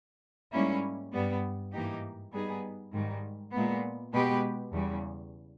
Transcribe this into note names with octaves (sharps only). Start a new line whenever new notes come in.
G#2 G3 A#3 C#4 E4
G2 G3 B3
G#2 E3 A#3 D#4 G4
G3 B3 D#4 G#4 B4
G#2 D#3 G3
A#2 G#3 B3
B2 G#3 B3 G4 B4
E2 C#3 G3